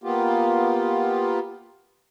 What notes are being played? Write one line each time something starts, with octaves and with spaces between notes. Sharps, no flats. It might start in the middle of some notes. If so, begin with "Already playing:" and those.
A#3 B3 F4 G4